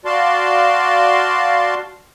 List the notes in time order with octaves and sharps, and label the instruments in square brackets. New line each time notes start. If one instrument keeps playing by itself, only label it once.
[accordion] F#4 D5 F5 A5 C6